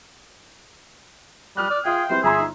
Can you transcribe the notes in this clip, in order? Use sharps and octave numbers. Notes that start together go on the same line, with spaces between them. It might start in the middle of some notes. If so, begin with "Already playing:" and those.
G3 D#6 F6 F#6
D5
F4 G#4 E5 F5 G5
E2 G3 C4 E4 C5
G1 G#4 E5 A#5 C6
D#4